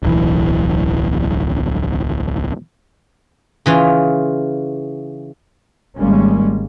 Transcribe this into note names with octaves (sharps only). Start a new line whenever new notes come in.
D1 B1 E3
C#3 E3 F4
G#1 G3 G#3 A#3 C#4